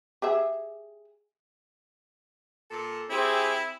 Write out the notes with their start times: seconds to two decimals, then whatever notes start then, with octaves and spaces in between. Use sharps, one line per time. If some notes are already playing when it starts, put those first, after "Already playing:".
0.22 G4 G#4 E5
2.69 A#2 A4
3.10 C4 E4 G4 G#4